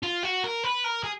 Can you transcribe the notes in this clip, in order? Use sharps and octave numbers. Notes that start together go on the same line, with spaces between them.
F4
F#4
A#4
B4
A#4
G#4